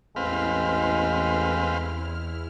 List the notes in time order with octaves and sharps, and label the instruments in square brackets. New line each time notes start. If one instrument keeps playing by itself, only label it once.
[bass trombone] A1 [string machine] E2 E4 F6 [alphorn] G#3 [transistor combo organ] C4 B4 F5